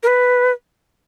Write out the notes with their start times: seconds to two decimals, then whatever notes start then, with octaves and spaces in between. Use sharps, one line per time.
0.03 A#4
0.07 B4